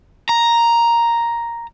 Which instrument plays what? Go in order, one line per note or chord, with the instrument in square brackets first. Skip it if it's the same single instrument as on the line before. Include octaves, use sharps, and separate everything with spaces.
[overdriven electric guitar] A#5